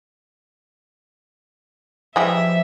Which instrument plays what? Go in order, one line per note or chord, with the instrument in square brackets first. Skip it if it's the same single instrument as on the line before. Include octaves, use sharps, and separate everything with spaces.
[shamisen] E3 G3 G#3 [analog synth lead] F3 [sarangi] E5